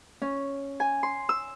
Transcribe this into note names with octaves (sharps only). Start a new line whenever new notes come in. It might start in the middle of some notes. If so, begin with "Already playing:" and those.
C#4
G#5
C6
E6